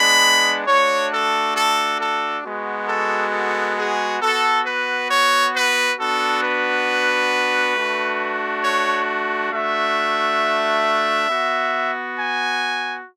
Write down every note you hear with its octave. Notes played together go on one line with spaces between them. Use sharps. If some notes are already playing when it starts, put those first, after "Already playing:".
Already playing: G#3 B3 D4 B5
A3 D4 F#4 C#5
A4
A4
A4
G#3 B3 F#4
A4
A4
G#4
B3 F#4 A4
B4
C#5
B4
B3 D4 F#4 A4
B4
A3 D4 F#4
C#5
A3 D4 F#4 E5
B3 F#4
G#5